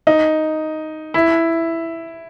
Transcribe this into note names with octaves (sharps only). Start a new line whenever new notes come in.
D#4
E4